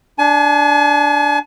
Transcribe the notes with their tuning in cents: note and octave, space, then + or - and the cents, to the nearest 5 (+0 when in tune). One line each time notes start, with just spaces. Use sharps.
D4 +0 G#5 +40